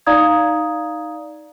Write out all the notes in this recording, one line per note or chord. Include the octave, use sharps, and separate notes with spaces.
D#4 D5 F5 A#5 D#6 G#6